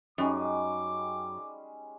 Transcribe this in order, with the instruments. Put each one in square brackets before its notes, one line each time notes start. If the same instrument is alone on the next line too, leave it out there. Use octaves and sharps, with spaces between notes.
[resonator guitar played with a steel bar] F#2 [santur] G3 G#3 C#4 [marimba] D#4 [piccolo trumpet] D6